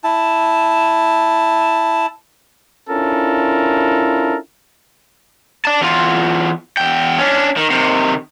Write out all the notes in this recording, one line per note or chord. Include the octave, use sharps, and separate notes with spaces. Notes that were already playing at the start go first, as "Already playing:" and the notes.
E4 A5
C#4 D4 E4 F4 A4 A#4
D5 A5
E2 F4
E2 G5
C#4 D4
D#3
C3 D#3